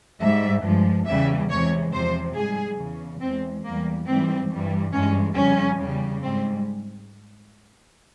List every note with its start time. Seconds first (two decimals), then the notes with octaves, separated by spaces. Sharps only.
0.21 G#2 E5
0.26 G3
0.64 G2 F3 G#3
1.07 E2 C#3 G3 E5
1.50 E2 C3 E3 G#3 C#5
1.93 E2 C3 F3 C5
2.36 G#2 G3 G#4
2.78 E2 C#3 E3
3.21 E2 E3 G#3 C4
3.65 E2 E3 G3 A#3
4.07 G#2 E3 G3 C4
4.51 G2 E3 G3
4.94 G2 E3 G#3 C#4
5.36 F2 C#3 G3 C#4
5.79 E2 C#3 G3
6.22 G#2 G3 C4